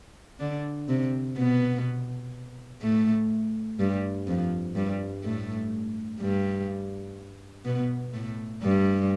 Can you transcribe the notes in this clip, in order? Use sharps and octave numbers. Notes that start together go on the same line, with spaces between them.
D3 D4
C3 C4
B2 B3
A2 A3
G2 G3
F2 F3
G2 G3
A2 A3
G2 G3
B2 B3
A2 A3
G2 G3